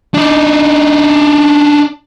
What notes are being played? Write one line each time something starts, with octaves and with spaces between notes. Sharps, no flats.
D4 D#4